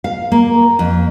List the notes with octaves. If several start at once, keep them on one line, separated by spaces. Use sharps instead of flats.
F5
A#3
F2